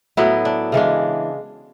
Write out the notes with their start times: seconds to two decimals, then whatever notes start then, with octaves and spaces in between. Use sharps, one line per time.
0.17 A2 F#3 B3 E4
0.45 D4
0.72 C#3 E3 G#3 D4